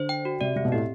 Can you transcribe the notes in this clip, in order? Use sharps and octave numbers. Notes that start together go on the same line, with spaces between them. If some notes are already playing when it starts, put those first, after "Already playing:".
Already playing: D3 C5
G5
F#4
C3 D5
C3 C4
B2
A2 G4